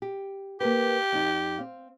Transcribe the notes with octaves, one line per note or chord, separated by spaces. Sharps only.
G4
A#3 G4 A#4 B4
F2 D#4
C4 F5